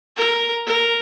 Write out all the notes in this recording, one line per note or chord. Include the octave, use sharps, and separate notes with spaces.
A#4
A#4